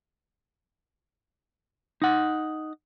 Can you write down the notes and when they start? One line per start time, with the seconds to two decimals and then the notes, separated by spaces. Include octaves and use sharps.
2.02 D#4 F#5